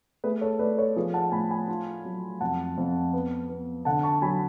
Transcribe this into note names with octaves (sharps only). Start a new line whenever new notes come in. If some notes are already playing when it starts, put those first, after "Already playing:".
A3 G#4 B4
A4 C#5
A3 B4 D5
A4 C#5
F3 G#4 B4
F#5 A5
A2 G#5 B5
G#5 B5
F4
F#3
F2 F#5 A5
F2
B3
B3
D3 F#5 A5
A5 C#6
F#3 G#5 B5